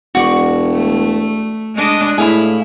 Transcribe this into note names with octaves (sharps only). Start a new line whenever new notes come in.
E1 F#4 D5 C#6
A3
G#3 D4 D#5
A2 E4 G#4 F5 B5